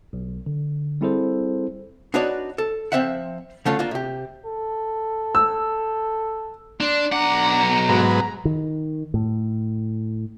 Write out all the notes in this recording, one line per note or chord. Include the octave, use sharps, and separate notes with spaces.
B1
D3
G3 C4 E4 G#4 A4 C5
D4 D#4 F#4 B4 C#5 D5
A4
F3 A#3 C4 C5 E5 F#5
D3 A3 C#4 F4
A#3 D4 F4
C3 G4
A4
E6
D4 C6
B1 D4 F#5 A#5
G#2 F#3 B3
D#3
A2